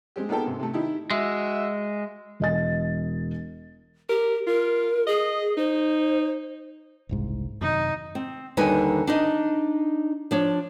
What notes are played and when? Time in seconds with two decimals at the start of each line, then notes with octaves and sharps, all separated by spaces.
0.16 G#3 C4 G4
0.29 A#3 B3 D#4 G#4 A4 G5
0.46 G#2 C3
0.60 C3 A3
0.73 D#3 D#4 E4 G4
1.11 G#3 F#4 E5
2.40 E1 D#5 A6
4.09 G4 A#4
4.47 F4 A#4
5.07 G#4 D#5
5.58 D#4 C5
7.09 F#1 C2 G#2
7.61 F#2 C3 D#3 D#4
8.15 C4
8.57 D#2 D3 G3 D#4 B4 G#5
9.07 D4 D#4 D#5
10.31 F3 D4 C#5